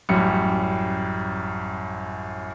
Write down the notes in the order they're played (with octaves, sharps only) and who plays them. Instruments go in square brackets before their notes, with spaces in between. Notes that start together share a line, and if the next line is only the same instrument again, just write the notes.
[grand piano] A1 F#2 G3 C#7